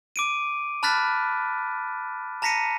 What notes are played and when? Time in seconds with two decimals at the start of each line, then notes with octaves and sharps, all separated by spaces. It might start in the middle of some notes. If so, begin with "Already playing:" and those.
0.16 D6 D7 D#7
0.83 A5 B5 F6 F#6 A6 B6
2.42 A5 A#5 A#6 B6 C#7 D#7